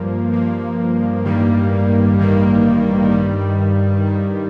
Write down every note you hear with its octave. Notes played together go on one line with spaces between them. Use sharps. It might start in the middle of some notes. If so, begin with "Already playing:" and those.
Already playing: G2 F3 A#3
G2 F3 A#3
A1 G2 D#3 G3 A#3
A1 G2 D#3 G3 A#3
G2 D#3 G3
G2 D#3 G3